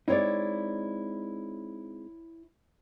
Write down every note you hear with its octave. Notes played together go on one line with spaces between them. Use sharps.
G#3 C4 D#4 E4 C#5 D5